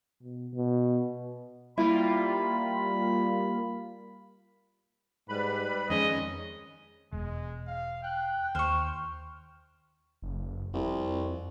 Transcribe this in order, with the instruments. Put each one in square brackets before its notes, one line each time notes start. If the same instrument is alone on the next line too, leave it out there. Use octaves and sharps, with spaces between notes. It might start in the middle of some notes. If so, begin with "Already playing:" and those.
[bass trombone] B2
B2
[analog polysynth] G3 A#3 F4 [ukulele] E4 [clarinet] B5
[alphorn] G#2 [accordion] G3 B4 B5
[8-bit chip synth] F2 D#3 C#4 [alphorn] G#3 [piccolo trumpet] D#5
[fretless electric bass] E1 [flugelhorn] G#3
[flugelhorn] F5
[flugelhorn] G5 [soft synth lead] F#6
[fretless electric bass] D#2 [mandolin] C5 C#6 [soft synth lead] F6
[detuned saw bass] F#1
[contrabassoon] C2 [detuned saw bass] F2